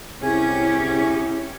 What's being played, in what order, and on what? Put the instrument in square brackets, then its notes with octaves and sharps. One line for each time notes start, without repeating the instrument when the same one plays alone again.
[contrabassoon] C2 [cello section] C#4 G4 [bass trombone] E4 [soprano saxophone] G#4